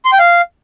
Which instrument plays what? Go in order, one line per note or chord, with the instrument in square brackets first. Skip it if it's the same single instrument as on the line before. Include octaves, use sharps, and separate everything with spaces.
[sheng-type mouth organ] C6
G5
F5